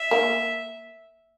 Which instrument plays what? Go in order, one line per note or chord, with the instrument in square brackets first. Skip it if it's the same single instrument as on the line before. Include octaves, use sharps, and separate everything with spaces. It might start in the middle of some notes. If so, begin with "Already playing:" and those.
Already playing: [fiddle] E5
[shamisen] A#3